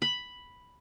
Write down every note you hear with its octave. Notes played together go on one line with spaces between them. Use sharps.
B5